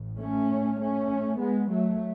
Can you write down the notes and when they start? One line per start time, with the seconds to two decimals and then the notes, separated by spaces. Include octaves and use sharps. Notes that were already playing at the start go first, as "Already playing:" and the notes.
Already playing: A1 A2
0.20 A3 C#4
0.80 A3 C#4
1.40 G#3 B3
1.71 F#3 A3